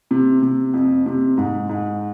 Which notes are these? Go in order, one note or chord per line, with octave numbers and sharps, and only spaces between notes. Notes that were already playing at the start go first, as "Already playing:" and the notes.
C3
C3
F2
C3
G#2
G#2